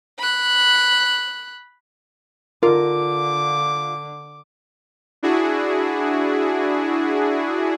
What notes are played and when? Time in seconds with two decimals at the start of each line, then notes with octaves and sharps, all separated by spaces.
0.18 B5 F#6
2.63 D3 F4 A#4 D6
5.23 D4 E4 F#4 G#4